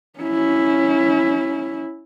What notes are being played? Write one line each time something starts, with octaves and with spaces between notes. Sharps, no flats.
C#4 E4